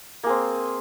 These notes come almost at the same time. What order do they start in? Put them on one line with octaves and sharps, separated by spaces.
A#3 G#4 C4